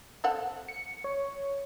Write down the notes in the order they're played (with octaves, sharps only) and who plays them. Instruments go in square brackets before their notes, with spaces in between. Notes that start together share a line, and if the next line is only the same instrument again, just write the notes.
[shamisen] C4 A4 F#5
[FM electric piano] C#7
C#5